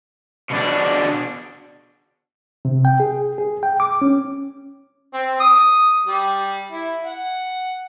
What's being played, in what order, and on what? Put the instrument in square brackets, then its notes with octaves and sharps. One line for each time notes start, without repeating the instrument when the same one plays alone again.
[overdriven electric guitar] B2 D4
[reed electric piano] C3
G5
G#4
G#4
G5
D6
C#4
[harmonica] C4
D#6
G3
E4
F#5